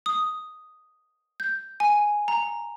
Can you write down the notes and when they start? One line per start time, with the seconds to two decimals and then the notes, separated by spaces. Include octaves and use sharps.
0.06 D#6
1.40 G6
1.80 G#5
2.28 A#5